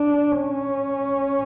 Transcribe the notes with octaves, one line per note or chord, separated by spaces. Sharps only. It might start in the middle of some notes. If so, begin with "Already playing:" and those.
Already playing: D4
C#4